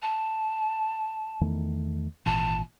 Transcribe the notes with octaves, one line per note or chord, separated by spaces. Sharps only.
A5
E2 D#3 A3
G#1 A#2 E3 A5